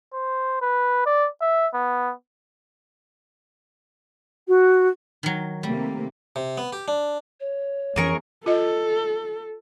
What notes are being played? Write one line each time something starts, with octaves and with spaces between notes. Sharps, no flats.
C5
B4
D5
E5
B3
F#4
D#3 F#3
C3 G3 A3 A#3
C3
B3
G4
D4
C#5
F2 E3 C#4 G#4 A#4 C#6
F4 A4 D#5